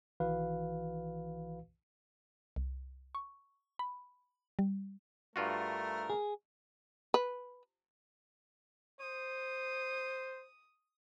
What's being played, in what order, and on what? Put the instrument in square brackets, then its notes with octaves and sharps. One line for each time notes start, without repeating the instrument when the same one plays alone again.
[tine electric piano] B1 D#3 E3 F#4 B4 F5
[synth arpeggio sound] C2
C#6
B5
G3
[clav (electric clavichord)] G2 F4 F#4 [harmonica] A3 A#4
[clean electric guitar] G#4
[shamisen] B4
[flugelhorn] C5 [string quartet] D#6